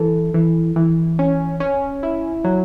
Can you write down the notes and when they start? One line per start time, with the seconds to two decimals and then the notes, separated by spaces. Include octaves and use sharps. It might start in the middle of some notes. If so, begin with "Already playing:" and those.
Already playing: E3 A4
0.34 E3
0.76 E3
1.19 C#4
1.60 C#4
2.03 E4
2.44 F#3